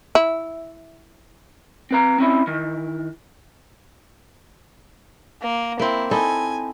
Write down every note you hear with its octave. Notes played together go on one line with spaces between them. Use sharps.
E4
C4 B4 A#5
C4 C#4 E4
D#3 E3
A#3
A#3 C4 E4
D#4 E4 A4 G#5